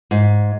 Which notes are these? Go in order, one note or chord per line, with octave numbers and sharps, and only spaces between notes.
G#2